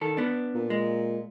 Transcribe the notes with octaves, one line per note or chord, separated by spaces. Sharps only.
D#3 A4
B3 D4
A#2
G#3